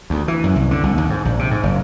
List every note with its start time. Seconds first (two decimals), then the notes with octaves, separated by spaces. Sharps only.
0.10 D2
0.28 E3
0.44 F#2
0.56 C2
0.71 D3
0.83 C2
0.98 D#2
1.10 G#2
1.25 A#1
1.39 C3
1.51 G#2
1.63 F#1